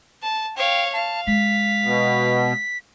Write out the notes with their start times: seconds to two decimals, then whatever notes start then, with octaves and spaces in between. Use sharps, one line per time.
0.22 A5
0.57 C#5 F5 G5
0.93 F5 A5
1.27 G#3 B6
1.84 B2